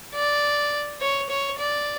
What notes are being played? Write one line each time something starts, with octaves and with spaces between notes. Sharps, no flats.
D5
C#5
C#5
D5